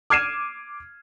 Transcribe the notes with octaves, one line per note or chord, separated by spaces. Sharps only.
D6 F6 G#6 C7 D#7 E7